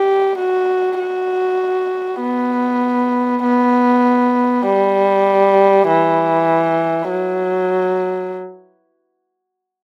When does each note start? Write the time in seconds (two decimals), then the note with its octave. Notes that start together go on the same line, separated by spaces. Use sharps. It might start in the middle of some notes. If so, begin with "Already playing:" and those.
Already playing: G4
0.38 F#4
0.99 F#4
2.21 B3
3.43 B3
4.65 G3
5.88 E3
7.10 F#3